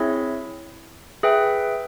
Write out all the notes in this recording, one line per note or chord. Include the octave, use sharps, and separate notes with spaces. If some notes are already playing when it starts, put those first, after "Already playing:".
Already playing: C4 E4 G#4 C#5 E5
G#4 B4 E5 G5